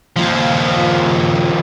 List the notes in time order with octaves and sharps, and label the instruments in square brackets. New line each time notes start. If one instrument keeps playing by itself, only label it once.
[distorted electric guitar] D#2 F3